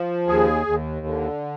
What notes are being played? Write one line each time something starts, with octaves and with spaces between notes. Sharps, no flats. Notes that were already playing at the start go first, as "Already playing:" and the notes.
Already playing: F3
D#2 G#4
D#2
D3